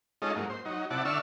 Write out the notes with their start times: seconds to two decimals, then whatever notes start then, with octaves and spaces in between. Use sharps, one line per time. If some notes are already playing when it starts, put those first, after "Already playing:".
0.22 G#3 C#4 D#4 F4 A4 D#5
0.36 G#2 F#3 A#3
0.50 C5
0.65 F#3 D#4
0.90 C3 E4 D5 F#5 A5
1.05 D3 D4 E5 C#6 E6 F6